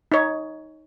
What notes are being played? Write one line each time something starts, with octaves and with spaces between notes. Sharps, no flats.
D#4 C#5